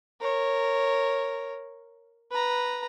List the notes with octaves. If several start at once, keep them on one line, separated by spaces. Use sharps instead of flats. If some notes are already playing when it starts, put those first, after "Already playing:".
A#4 C#5
B4 A#5